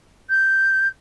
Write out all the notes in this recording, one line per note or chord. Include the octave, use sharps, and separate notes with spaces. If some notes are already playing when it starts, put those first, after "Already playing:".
G6